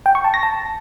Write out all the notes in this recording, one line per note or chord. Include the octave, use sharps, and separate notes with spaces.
G5
C#6
A5
A#6
A5